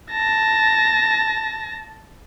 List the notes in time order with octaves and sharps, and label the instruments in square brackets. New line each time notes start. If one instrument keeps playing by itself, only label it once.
[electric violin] A5 A#6